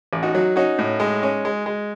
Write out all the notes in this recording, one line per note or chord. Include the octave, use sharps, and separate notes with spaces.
A1
D#4 F#4
F#3
C#4 D#4 F#4
A2
G#3
C#4
G#3
G#3